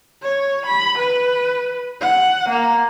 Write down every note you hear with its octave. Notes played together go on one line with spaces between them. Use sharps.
C#5
B5
B4
F#5
A#3